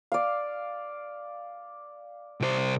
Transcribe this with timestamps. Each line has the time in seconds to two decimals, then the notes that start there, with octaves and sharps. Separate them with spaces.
0.12 D5 F5
2.40 C2 C5